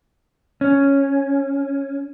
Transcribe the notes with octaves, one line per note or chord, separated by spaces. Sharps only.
C#4